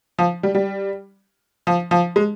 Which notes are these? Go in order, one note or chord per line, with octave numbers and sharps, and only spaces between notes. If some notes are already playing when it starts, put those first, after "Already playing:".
F3
G3
G3
F3
F3
G#3